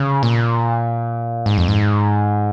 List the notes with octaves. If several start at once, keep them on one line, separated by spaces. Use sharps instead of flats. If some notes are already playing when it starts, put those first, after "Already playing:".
Already playing: C#3
A#2
G#2
F2
G#2